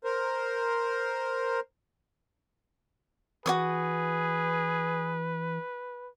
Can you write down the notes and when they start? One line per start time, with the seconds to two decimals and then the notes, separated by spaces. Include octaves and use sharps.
0.04 A#4 C5
3.46 E3 F#4 G#4 B4 C#5 D#6